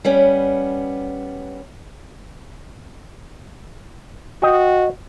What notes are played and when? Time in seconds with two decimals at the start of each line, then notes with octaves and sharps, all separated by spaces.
0.05 G3 B3 C#4
4.43 F#4 D#5 G5